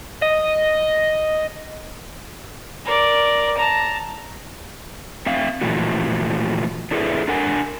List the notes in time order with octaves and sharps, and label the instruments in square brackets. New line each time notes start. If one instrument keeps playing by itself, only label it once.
[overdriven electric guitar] D#5
[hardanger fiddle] A#4 D5
A5 A#5
[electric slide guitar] C4 E5 F5
A#2 E3 F3 A3 F#4
D4 E4 G#4 A4 B4 E5
D4 A#4 F#5 G#5